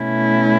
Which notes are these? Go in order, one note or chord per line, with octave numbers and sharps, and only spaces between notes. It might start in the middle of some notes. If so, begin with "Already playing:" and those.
Already playing: B2 A3 C#4 E4